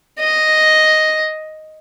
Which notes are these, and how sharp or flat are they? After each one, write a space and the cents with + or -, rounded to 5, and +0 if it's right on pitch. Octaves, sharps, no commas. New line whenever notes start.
D#5 +0